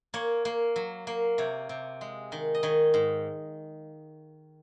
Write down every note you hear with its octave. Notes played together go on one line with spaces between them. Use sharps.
A#3 C#5
A#3
F#3
A#3
C3 C#5
C3
G#3
D#3
D#5
D#3 C#5
G#2